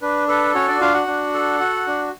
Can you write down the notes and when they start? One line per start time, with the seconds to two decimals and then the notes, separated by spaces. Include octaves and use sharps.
0.02 D4 B4
0.28 A4 B4
0.55 C#4 F#4 C#5
0.68 D4 D5
0.81 D4 F4 F5
0.94 F#4 F#5
1.07 D4
1.34 A4
1.60 F#4
1.87 D4